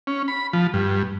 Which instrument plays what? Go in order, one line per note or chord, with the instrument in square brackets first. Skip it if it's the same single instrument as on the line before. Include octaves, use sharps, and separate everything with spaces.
[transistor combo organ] C#4
B5
F3
G2